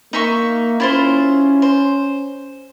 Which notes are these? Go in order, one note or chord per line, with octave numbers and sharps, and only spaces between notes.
A#3 D#4 E5 C#6
C#4 E4 F4 C5
C5